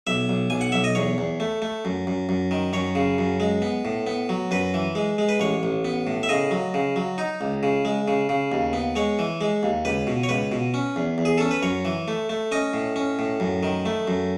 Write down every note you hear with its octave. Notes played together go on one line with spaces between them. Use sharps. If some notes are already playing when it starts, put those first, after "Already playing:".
B1 E5
B1
B1 G#5
F#5
B1 E5
D#5
E2 C#5
E2
A3
A3
F#2
F#2
F#2
D#3
F#2 C#5
C#3
F#2
G#3
B3
A2
B3
F#3
F#2 B4
E3
G#3
G#3
B4
A1 C#5
A1
B3
A2
E5
C#3 D#5
F#3
C#3
F#3
D#4
C#2
C#3
G#3
C#3
C#3
D#2
B3
G#3 C#5
E3
G#3
D#2
C#2 B4
B2
C#5
C#2 B4
B2
C#4
E2
E2
G#4
C#4 A4
B4
F#2 C#5
E3
A3
A3
C#4 D#5
A2
C#4
A2
F#2
D#3
A3
F#2